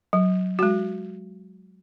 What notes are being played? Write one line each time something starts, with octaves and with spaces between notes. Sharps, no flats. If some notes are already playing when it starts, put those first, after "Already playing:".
F#3
G#3 F#4